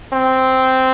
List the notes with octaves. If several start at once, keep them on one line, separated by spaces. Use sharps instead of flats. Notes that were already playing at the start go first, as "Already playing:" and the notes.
C4